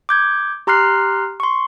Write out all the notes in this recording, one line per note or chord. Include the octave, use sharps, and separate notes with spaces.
D6 G6 G#6
G4 A#5 C6 F6 F#6 C7
C6 C#6